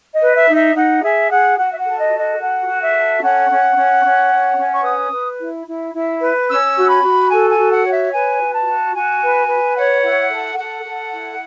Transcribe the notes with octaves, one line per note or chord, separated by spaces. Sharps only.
D#5
B4
E5
D#4
E5
D#4 F#5
G#4 E5
G#4 F#5
F#4 F#5
E5
F#5
A4
D#5
F#4
D#5
A4 F#5
F#4
E5
A4
C#4 F#5
C#4
C#4
C#4
C#5
C#4
C#6
B4 D#6
B4
E4
E4
E4
B4
C#4 E6
F#4
B5
F#4
A4 G#5
G#5
F#4
F#5
C#5
E5
B4 G#5
F#4
A5
F#4
F#4 G#5
B4
B4
C#5 F#5
E4
A4
A4 F#5
A4
E4